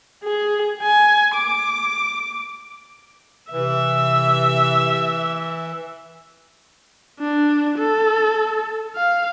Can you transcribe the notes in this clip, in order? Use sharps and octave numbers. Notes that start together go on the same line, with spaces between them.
G#4
G#5
D6
C3 E3 E5
D4
A4
F5